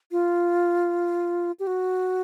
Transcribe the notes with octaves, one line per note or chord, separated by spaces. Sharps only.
F4
G4
F#4